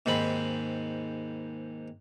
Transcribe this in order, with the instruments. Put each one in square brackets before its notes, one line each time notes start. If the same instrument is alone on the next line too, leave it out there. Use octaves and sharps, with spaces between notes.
[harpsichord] D#2 G#2 C4 B5